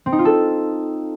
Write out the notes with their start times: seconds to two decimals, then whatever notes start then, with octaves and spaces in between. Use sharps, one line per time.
0.06 C4
0.12 D#4
0.19 F4
0.25 A4